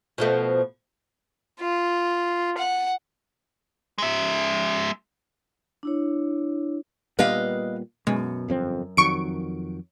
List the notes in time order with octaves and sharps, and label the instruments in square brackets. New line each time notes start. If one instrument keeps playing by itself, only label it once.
[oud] B2 F3 A3
[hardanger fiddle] F4
F#5
[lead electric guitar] G#3 E5
[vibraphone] D4 E4 C#5
[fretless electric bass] A#2 G3 B3 [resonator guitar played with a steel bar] B4 D#5 F5
[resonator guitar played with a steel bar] F#2 [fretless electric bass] B2 [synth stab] G#3
[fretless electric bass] G1 F2 C4
[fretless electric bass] F2 D#3 F#3 [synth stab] C#6 D7